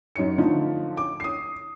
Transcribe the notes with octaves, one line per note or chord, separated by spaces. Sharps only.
F#2 D#4 C#5 C#7
D3 F3 A3 D#4
D6
D#6 C7